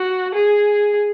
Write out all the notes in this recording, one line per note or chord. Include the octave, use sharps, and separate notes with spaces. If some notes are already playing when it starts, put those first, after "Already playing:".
Already playing: F#4
G#4